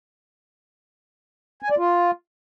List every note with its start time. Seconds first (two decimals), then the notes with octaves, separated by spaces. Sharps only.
1.63 G#5
1.70 D5
1.78 F4